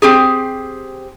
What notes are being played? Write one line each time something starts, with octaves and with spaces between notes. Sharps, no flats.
C4 G4 G#4